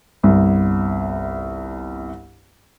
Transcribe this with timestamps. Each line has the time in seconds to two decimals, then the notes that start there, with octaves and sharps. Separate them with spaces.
0.23 G1 C2